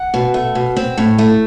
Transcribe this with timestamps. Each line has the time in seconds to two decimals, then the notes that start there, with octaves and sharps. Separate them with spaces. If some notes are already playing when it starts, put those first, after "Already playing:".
Already playing: F#5
0.14 B2
0.34 A3
0.55 B2
0.76 C4
0.98 A2
1.18 A3